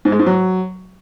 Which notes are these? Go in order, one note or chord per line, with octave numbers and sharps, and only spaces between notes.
G#2
G#3
G#2
F#3